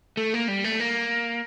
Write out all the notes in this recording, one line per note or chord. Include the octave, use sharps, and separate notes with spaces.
A3
A#3
G3
A3
A#3